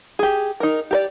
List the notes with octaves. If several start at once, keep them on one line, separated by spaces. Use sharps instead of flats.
G4 G#4
D#4 A#4
G4 A#4 D5